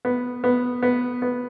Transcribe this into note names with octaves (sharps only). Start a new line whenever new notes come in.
B3
B3
B3
B3